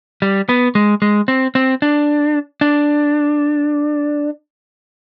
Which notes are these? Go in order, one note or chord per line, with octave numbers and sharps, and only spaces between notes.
G3
B3
G#3
G#3
C4
C4
D4
D4